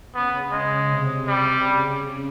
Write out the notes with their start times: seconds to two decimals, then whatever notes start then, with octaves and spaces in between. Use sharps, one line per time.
0.14 C#3 B3
0.51 G#3
0.90 C3
1.28 C3 G3
1.66 C#3